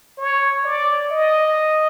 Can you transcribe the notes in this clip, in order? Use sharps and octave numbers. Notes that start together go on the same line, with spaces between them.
C#5
D5
D#5